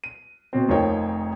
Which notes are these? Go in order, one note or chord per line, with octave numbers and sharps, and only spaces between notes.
D#7
B2 C4
F1 F3 D#4 A#4 C#5 G5